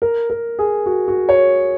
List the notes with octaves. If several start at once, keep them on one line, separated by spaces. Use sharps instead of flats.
A#4
A#4
G#4
F#4
F#4
C#5